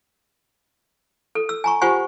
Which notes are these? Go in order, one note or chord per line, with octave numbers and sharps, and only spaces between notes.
A4
E6
G#5 A#5 C#6
F4 G4 C5 F#5 G#5 C#6